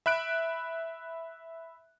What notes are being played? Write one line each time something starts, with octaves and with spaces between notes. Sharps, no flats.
E5 B5 F#6 D7